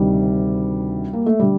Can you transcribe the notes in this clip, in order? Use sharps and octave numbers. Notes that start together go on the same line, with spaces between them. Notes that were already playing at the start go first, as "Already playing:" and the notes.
Already playing: D2 C3 D#3 G3
A#3
A3
D3 G3